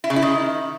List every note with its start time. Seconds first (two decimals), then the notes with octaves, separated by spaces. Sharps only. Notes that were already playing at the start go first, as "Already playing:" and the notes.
0.04 E4
0.10 C#3
0.16 E4
0.22 D#3